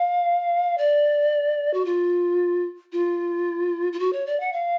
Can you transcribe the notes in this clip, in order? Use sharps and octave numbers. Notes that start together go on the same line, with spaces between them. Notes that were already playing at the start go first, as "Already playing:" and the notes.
Already playing: F5
D5
F#4
F4
F4
F4
F#4
C#5
D5
F#5
F5